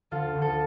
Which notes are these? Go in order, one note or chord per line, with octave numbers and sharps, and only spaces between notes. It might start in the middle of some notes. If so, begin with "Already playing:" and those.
D2 F4 A4
D2
F4 A4